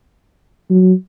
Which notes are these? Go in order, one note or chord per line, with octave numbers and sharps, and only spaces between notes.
F#3